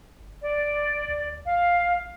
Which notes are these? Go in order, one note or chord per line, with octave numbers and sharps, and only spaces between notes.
G1
D5
D2
A1 F5